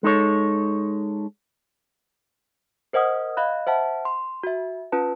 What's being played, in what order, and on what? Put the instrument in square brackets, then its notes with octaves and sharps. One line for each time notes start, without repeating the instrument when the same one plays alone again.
[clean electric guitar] G#3 D#4 A4 C#5
[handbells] A#4 C5 D#5 F#5 D#6 F6
D#5 F5 B5 F#6
C5 E5 F#5 A5
C6
F#4 E5
C#4 F4 B4 A5